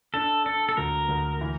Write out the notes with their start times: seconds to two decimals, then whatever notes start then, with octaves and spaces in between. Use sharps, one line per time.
0.14 D4 A4
0.45 D4 A4
0.69 A4
0.77 D2 A#4
1.09 D2
1.41 E3